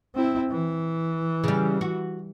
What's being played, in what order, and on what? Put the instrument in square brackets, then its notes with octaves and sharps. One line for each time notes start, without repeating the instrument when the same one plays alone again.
[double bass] C4 E4
E3
[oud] C#3 G3
F#4